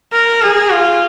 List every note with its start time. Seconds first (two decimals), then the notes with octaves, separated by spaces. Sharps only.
0.13 A#4
0.42 G#4
0.72 F4